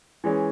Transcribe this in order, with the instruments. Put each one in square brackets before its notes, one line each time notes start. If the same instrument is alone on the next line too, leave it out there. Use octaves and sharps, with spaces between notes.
[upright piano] E3 G#3 C#4